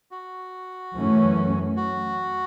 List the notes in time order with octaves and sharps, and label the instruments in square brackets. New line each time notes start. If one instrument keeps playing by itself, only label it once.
[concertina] F#4
[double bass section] F#2 E3 A3 C#4
[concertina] F#4